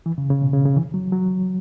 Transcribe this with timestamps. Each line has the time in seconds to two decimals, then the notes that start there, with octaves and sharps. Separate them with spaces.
0.06 E3
0.18 C#3
0.30 C#3
0.42 B2
0.53 C#3
0.65 C#3
0.76 E3
0.94 F#3
1.12 F#3